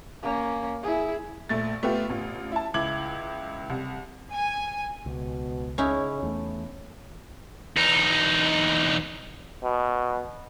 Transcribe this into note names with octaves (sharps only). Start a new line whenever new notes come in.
A#3 C#4
E4 G#4
A#1 A3 A6
A3 B3 F4 G4
A1 F4
E4 A5
C#2 E4 D6 G#6 F#7
C2
G#5
C#2 B2
C#3 C#4 D#4 E4
E2 A3
E2 D#4
B2